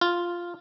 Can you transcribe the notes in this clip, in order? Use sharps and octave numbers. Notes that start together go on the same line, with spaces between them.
F4